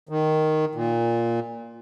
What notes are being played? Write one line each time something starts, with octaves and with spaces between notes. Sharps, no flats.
D#3
A#2